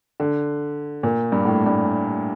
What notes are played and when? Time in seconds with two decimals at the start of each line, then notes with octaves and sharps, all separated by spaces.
0.20 D3
1.03 A#2
1.32 G2
1.45 A2
1.66 G2